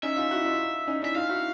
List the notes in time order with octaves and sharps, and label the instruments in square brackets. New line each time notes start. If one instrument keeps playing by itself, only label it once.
[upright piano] C#4 D#4 [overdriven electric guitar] E5
[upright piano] D#4 F4
E4 F#4
D#4 F4
C#4 D#4
[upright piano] D4 E4 [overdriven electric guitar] E5
[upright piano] D#4 F4 [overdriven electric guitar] F5
[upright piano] E4 F#4